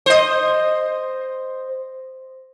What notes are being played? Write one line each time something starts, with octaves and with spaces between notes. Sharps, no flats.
C5 D#5